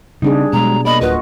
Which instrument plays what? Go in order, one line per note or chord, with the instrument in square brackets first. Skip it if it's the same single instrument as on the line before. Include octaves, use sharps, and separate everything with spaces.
[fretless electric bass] C#3 [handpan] G3 D4 G#4 [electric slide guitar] C4 D#4
[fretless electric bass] B2 [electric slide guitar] F#3 G#3 B3 [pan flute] A#5
[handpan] A#3 D#5 [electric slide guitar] D5 [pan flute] B5
[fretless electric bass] D1 [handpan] F4 F#4 [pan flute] B4